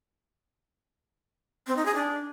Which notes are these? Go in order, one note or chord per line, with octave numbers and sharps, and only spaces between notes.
C4
D#4
G#4
D4